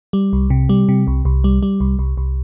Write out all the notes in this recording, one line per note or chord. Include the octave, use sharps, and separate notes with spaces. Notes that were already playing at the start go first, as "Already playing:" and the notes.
G3
C2
C3
G3
C3
C2
C2
G3
G3
C2
C2
C2